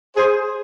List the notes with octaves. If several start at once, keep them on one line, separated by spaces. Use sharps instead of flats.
G#4 C5